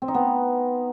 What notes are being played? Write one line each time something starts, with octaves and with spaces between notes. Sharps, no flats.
C4
D#4
B3